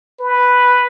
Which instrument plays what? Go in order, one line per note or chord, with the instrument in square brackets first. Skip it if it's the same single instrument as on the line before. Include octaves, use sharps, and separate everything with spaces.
[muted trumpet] B4